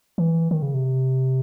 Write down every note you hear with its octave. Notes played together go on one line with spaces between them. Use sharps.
E3
D#3
C#3
C3